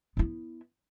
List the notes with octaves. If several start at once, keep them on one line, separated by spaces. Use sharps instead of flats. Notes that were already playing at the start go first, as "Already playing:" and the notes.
B3 E4